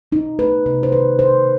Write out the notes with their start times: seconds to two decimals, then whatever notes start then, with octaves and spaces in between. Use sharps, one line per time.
0.12 B2 D#4
0.39 A3 B4
0.66 C3 B4
0.83 C5
0.92 D#3 B4
1.19 B2 C5